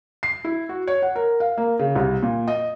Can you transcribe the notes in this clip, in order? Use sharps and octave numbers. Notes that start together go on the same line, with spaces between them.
C7
E4
F#4
C#5
F#5
A#4
F5
A#3
C#3
C2
A#2
D#5